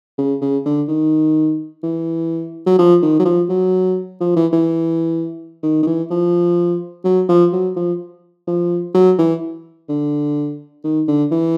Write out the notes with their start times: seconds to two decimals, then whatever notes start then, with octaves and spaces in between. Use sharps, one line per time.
0.18 C#3
0.41 C#3
0.65 D3
0.88 D#3
1.83 E3
2.66 F#3
2.79 F3
3.02 D#3
3.19 F#3
3.25 F3
3.49 F#3
4.21 F3
4.36 E3
4.53 E3
5.63 D#3
5.83 D#3
5.86 E3
6.10 F3
7.04 F#3
7.29 F3
7.53 F#3
7.76 F3
8.47 F3
8.94 F#3
9.19 E3
9.89 D3
10.84 D#3
11.08 D3
11.31 E3